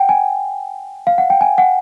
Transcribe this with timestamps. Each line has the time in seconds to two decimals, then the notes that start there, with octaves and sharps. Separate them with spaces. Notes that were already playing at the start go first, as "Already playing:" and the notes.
Already playing: F#5 G5
0.09 G#5
1.07 F5
1.18 F#5
1.30 G5
1.41 G#5
1.58 F#5